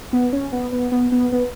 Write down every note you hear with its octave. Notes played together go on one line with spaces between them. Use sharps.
B3
C#4
B3
B3
B3
B3
B3